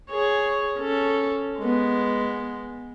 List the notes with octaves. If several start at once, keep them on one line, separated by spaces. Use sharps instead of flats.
G#4 C#5
C#4 A4
G#3 B3